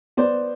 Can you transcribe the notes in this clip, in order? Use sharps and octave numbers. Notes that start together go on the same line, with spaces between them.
B3 C5 D5